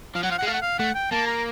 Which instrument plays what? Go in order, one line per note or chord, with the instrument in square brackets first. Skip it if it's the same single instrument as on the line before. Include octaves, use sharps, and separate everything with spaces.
[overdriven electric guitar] F3 [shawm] F5
[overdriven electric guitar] F#3 [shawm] F#5
[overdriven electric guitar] F3 [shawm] F5
[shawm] F#5
[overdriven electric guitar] G#3
[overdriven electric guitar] A3 [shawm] F5
[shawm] F#5
F5
[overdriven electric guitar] A3 [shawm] F#5
[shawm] G5
[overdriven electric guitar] A#3 [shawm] A5
[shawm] A#5